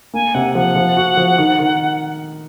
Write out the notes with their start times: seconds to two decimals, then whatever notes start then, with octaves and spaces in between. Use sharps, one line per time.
0.14 A#3 G#5
0.34 C3 F#5
0.55 F3 F#5
0.75 F3
0.97 F#4
1.17 F3
1.38 D#3
1.59 D#3